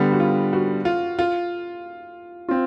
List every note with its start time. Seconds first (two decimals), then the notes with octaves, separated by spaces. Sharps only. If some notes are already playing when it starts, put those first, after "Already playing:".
Already playing: D3 G3 B3
0.12 F#4
0.20 F4
0.53 F#4
0.85 F4
1.19 F4
2.49 C4 F4